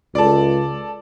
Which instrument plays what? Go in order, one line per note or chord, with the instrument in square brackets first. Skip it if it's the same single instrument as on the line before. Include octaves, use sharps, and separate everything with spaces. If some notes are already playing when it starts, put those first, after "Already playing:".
[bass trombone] C#2 [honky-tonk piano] A4 D5